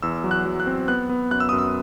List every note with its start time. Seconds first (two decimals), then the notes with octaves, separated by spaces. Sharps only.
0.02 E2 E6
0.24 F#3
0.31 F#6
0.45 F#3
0.60 F#6
0.67 C4
0.88 B3 F#6
1.09 B3
1.31 F#2 F#6
1.40 E6
1.49 F#2 D#6
1.58 E6